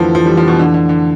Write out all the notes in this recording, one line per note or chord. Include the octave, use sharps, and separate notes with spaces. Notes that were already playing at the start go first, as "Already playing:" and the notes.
Already playing: F2 D3 E3 F3 A3 D4
F3
G3
F3
B2
D3
D3
D3